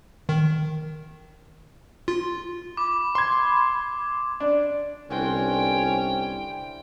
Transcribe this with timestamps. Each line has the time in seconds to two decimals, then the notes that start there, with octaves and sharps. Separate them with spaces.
0.29 D#3
2.08 F4
2.77 B5 D6
3.15 B5 C6 G#6
4.40 D4
5.10 C2 D3 E3 C#4 G5 C6